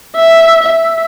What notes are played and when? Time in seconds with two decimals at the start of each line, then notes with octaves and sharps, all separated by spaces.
0.17 E5
0.63 E5